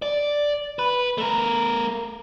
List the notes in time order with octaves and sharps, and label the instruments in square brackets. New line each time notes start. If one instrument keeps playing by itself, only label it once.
[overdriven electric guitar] D5
B4
A3 A#4